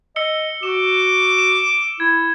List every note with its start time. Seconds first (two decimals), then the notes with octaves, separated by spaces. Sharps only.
0.16 D#5 E6 C#7 G7
0.63 F#4 D6 E7
1.38 E7
2.00 E4 G#6